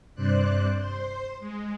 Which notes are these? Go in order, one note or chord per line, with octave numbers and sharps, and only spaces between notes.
G2 C3 C5 D5 F#6
C5 C6
G#3